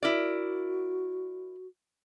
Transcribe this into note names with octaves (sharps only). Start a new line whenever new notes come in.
E4 F#4 A#4 D5